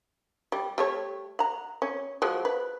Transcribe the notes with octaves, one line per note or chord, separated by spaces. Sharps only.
G3
G3 A3 C#5
F#5 A#5
C#4
F3 F#3 G#3
B4